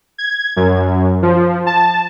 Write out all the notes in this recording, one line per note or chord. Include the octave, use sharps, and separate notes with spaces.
G#6
F#2
F3
A5